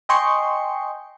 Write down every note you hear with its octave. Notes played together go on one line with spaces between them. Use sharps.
D#5 G5 G#5 C6 C#6 C#7